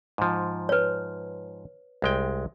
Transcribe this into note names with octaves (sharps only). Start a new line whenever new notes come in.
G#2 F3
B4 C#5
C2 G#3 G5